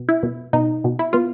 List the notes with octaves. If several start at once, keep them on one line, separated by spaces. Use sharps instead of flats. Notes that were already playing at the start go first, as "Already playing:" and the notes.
Already playing: B2
E4
B2
B2 D#4
B2
E4
B2 F4